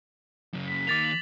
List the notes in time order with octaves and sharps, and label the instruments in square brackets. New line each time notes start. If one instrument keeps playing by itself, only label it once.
[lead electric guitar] F#2 C#3
[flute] B6
[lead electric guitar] D#3 A#3 [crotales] D6 A6 F7
[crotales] F#7